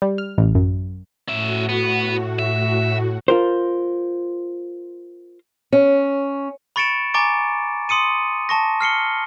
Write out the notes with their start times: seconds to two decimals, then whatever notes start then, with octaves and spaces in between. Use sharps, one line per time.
0.02 G3
0.18 F6
0.38 A1
0.55 F#2
1.28 A2 C#4 F#4 E5
1.69 B3
2.39 E5
3.28 F4 A#4 C5
5.72 C#4
6.76 B5 C#6 A6 C#7 D7 E7
7.14 G#5 A#5 C#6 D6 A6 D7
7.89 C6 D#6 C#7 D#7
8.49 A5 C#6 A#6
8.81 F6 C7 C#7 G7